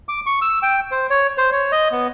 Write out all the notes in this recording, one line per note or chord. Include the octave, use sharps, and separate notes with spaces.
D6
C#6
E6
G5
C5
C#5
C5
C#5
D#5
B3